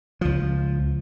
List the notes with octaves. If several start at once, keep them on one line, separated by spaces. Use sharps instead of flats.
C#2 F3